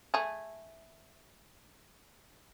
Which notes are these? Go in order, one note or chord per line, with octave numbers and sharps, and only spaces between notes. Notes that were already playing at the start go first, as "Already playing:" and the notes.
A3 G#4